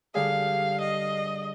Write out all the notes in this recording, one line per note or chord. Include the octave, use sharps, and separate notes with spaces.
D3 G3 G#4 F5
D#5